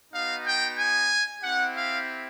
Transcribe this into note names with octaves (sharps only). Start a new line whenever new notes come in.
B3 D#4 F#4 F5
G5
G#5
C4 E4 G4 F#5
F5